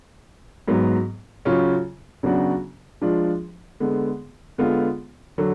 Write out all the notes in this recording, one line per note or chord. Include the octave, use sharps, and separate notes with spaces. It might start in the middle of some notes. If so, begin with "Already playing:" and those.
G#2 F#3 B3
C#3 F#3 C#4 F4
C#3 F#3 B3 D4 F#4
F3 G#3 D4 F4
D3 G#3 B3
D3 G#3 B3 F4
D3 F#3